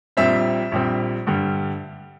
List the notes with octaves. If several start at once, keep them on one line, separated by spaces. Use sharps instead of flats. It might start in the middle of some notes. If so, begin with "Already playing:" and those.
A#1 A#2 G3 C4 E5
A#1 A#2 G3 C4
G2 D3 G3